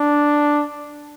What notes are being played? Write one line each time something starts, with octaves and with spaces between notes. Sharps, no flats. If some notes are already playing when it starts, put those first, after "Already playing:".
Already playing: D4